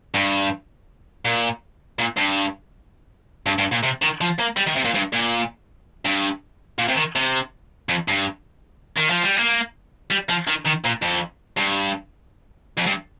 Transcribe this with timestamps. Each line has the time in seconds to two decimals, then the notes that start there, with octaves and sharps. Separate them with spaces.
0.14 G2
1.25 A#2
1.99 A#2
2.17 G2
3.46 G2
3.58 G2
3.72 A#2
3.83 C3
4.02 D#3
4.21 F3
4.39 A#3
4.57 G3
4.66 D#3
4.75 C3
4.84 A#2
4.94 G2
5.13 A#2
6.05 G2
6.78 A#2
6.88 C3
6.96 D#3
7.15 C3
7.89 F2
8.08 G2
8.97 D#3
9.10 F3
9.23 G3
9.37 A#3
10.10 G3
10.29 F3
10.47 D#3
10.65 D#3
10.84 A#2
11.02 F2
11.57 G2
12.77 F2
12.86 G2